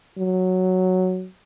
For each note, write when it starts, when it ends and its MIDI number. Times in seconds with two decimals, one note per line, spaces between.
0.18 1.27 54